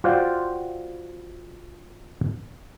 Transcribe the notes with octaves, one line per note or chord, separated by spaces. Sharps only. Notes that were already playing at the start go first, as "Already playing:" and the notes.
F4 F#4 C5 D5 F5 G5